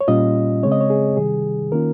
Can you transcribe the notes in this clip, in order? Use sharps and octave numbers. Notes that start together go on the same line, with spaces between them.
C#5
A#2 G3 C#4 F4 D#5
C#3 G#3 C4 C#5
D#5
C#5
G#4
C3 D#3 G3 G#4
D#3 A#3 C#4 F4 A#4